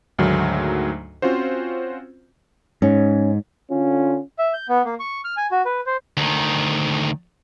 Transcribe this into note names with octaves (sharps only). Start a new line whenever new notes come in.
D2 G#2 D#3 F#3 A3
C4 C#4 F4 F#4 C5
G#2 C#4
D3 C#4 F4
E5
G6
B3
A#3
C#6
F6
G#5
F#4
B4
C5
D2 D#3